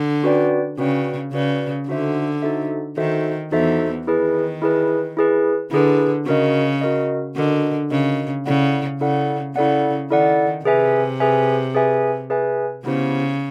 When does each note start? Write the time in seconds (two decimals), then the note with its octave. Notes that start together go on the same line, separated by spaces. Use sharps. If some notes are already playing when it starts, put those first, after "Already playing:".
Already playing: D3
0.23 C#4 F#4 B4 D5 G5
0.78 C#3 C#4 F#4 B4 D5 G5
1.32 C#3 C#4 F#4 B4 D5 G5
1.88 D3 D#4 F#4 A4 C5 E5
2.42 D#4 F#4 A4 C5 E5
2.97 D#3 D#4 F#4 A4 C5 E5
3.52 E2 E3 D#4 F#4 A4 C5 E5
4.07 D#3 E4 G#4 B4
4.62 E4 G#4 B4
5.17 E4 G#4 B4
5.71 D3 E4 G#4 B4
6.26 C#3 F#4 A#4 D#5
6.81 F#4 A#4 D#5
7.36 D3 F#4 A#4 D#5
7.91 C#3 F#4 A#4 D#5
8.46 C#3 E4 A4 D5 F#5
9.00 C#3 E4 A4 D5 F#5
9.56 C#3 E4 A4 D5 F#5
10.10 D#3 E4 A4 D5 F#5
10.65 C3 G#4 B4 E5 G#5
11.20 G#4 B4 E5 G#5
11.75 G#4 B4 E5 G#5
12.30 G#4 B4 E5 G#5
12.84 C#3 B3 E4 G4 C5